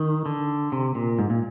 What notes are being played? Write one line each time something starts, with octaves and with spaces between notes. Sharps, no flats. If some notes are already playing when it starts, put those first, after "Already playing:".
Already playing: D#3
D3
C3
A#2
G#2
A#2